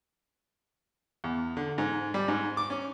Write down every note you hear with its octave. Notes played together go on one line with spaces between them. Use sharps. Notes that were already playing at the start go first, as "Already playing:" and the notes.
E2
D3
G#2
G3
G#2
D6
C#4